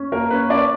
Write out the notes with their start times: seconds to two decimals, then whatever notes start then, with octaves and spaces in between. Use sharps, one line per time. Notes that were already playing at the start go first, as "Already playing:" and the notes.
Already playing: C#4
0.12 A#3 A#4
0.30 C#4 B4
0.49 C#4 D5